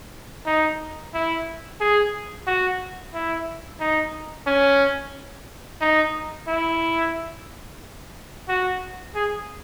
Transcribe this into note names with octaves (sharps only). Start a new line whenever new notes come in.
D#4
E4
G#4
F#4
E4
D#4
C#4
D#4
E4
F#4
G#4